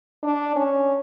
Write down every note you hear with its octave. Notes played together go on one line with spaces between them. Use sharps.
D4
C#4